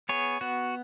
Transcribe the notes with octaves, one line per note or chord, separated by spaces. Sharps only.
B3 G#4 C#5
B3 F#4